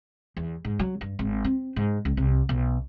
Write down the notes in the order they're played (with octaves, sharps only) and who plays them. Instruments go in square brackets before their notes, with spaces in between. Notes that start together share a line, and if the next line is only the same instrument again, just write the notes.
[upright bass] E2
G#2
F#3
G2
G#1
C4
G#2
C#2
C2
B1